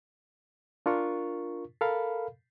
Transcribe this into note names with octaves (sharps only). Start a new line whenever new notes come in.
D4 F4 A#4 C#6
A4 A#4 F5 B5